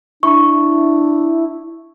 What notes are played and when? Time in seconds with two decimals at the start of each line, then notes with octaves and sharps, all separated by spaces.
0.23 D4 E4 C#6